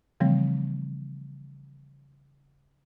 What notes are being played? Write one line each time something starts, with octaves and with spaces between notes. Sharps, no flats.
C#3 E3 F3 G3 A3 C4